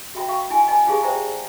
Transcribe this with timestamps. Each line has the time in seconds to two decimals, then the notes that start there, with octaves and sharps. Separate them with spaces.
0.15 F#4 E5 G5 B5
0.28 F#4 F5 G5 C#6
0.50 E4 F5 G#5 B5
0.68 D#5 G#5 A5 B5
0.87 F4 G4 G#4 F5 A5
1.03 C5 D5 E5 G5 A5 A#5